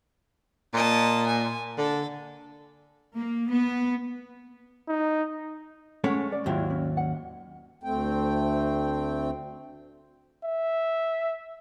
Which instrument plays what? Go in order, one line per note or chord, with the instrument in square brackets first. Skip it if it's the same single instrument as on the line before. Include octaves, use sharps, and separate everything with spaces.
[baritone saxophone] A#2 [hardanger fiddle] D#5 A5
[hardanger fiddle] G#5
[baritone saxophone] D3 [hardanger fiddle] A4
[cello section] A#3
B3
[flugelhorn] D#4
[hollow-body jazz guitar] G#3 A3 C#5 [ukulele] C#4 F#5
[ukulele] D5
[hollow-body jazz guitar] D#2 G#2 F#3 [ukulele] E4 F4 G4
[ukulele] C#4
F#5
[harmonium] D2 A3 C4 G5
[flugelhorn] E5